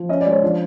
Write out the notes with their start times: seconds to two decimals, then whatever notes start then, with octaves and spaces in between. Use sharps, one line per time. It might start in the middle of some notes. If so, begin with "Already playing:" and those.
Already playing: F3
0.09 C#4 D#5
0.21 D5
0.26 G#3
0.32 C#5
0.43 F3 D4 D5